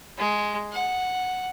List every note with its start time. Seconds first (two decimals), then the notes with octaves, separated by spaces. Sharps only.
0.18 G#3
0.72 F#5